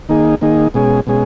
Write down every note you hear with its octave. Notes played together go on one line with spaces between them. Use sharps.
D#3 A#3 D#4 G#4
D#3 A#3 D#4 G#4
B2 G#3 C#4 G#4
B2 G#3 C#4 G#4